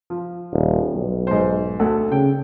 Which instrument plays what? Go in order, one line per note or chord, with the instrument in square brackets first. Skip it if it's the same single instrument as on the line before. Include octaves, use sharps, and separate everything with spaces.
[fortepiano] F3
[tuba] D#1
B1
[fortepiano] G#2 C5
D2 A4 F#5
[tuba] C#3 [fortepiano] G5